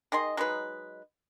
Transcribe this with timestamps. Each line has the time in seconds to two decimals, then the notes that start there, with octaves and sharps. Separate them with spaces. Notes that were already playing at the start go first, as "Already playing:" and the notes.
0.12 D#3 G#4 D#5 C6
0.37 F#3 G#3 D#4 B4